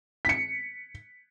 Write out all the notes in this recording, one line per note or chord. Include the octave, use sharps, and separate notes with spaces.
B6 C#7